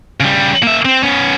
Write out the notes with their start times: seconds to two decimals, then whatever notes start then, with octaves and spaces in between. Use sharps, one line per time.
0.20 C#3 G3
0.63 A#3 E5
0.85 C4
1.03 B3 C#4